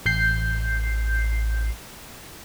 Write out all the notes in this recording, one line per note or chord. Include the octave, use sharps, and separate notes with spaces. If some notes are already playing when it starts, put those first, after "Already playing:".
A1 G6 C7